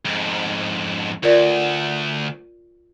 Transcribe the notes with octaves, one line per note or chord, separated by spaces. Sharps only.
F2 G#2
D2 F4 A#4 D5